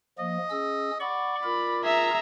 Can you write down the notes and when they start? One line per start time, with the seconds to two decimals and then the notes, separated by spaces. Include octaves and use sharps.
0.19 F3 A#3 D#5
0.51 C#4 G#4 E6
1.00 D5 F#5 B5 C#6
1.44 F4 A#4 B5
1.84 G#4 E5 A#5